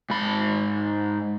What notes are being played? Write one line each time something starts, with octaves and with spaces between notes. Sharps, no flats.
G#2 B5